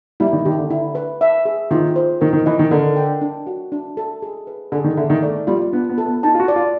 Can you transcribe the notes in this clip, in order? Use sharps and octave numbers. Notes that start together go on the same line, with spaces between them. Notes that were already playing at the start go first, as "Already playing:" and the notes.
G3 E4
D#3
D#3 G4
D3
E4
B4
E5
G#4
D#3 F4
C5
D#3 A#4
D#3
E3 D#5
D#3
D3 A#4
G5
D4
F#4
D4
A4
G#4
B4
D3 G#4
D#3
D3 E5
D#3
A3 D5
G3 F4
B3 D4
B3
A4
B3
D#4 A5
F4
F#4
D5
F4